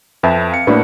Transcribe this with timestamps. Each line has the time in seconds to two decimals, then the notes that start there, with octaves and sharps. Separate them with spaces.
0.23 F2 B4 E5 A5
0.52 F5 C#7
0.67 A2 A3 A#3 D4 F#4 B4